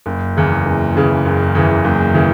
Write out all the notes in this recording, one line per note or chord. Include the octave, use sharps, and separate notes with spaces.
F#1
E2 C#3 E3
F#1
E2 C#3 E3
F#1
E2 C#3 E3
F#1
C#3 E3